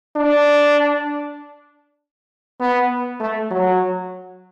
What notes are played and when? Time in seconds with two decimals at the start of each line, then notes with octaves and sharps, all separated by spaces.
0.16 D4
2.60 B3
3.20 A3
3.51 F#3